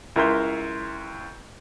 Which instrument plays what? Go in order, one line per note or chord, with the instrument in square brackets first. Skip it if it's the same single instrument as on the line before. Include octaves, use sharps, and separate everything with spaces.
[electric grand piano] C#2 E4 A#4 E5 C6 G6